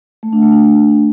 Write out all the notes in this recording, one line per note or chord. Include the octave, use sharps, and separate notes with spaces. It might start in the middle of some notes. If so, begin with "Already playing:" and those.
A3
D4
A3
D4